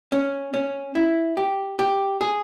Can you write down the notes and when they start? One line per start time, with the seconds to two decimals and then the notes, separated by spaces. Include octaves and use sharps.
0.12 C#4
0.54 C#4
0.95 E4
1.37 G4
1.79 G4
2.21 G#4